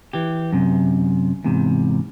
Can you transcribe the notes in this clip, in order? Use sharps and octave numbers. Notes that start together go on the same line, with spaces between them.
E3 G4
F#2 C3
E2 G#2 C3